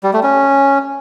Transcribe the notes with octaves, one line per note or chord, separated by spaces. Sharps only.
G3
A3
C#4